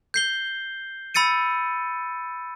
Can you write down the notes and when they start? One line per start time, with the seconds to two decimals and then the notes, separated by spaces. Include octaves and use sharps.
0.14 G6 C7 G7
1.14 B5 E6 A6 C#7 D#7